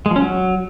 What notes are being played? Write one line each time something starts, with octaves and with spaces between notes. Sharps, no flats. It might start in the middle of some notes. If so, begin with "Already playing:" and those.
G#3
F3
C#4
F#3